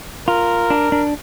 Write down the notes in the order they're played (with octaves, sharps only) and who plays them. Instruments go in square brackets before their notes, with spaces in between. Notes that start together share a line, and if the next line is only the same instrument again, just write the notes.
[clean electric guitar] F4 [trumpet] A#4
[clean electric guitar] D4
D4